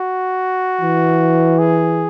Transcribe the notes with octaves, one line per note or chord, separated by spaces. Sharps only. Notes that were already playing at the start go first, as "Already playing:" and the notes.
Already playing: F#4
E3
G#4